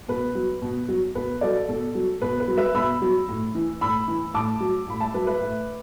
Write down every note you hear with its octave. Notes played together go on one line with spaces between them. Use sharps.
B2 B4
F#3
B2
F#3
B2 B4
F#3 A4 D5
B2 A4
F#3
B2 B4
B4
F#3
B4 E5
B2 B5 E6
F#3
A2
E3
A2 B5 E6
E3
A2 A5 D6
F#3
A2 B5
E5 A5
F#3 B4
B4 E5
A2